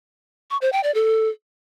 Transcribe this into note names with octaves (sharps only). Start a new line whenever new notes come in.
C#6
C5
G5
D5
A4